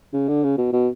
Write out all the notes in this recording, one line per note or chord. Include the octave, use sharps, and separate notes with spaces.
C#3
D3
C#3
B2
B2